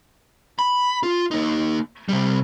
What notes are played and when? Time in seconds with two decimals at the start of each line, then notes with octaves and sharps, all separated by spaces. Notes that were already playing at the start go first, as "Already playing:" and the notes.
0.59 B5
1.03 F4
1.31 A#3 D#4
2.09 C3 G3